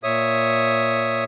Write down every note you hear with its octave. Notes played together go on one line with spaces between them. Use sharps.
A#2 C#5 E5 D#6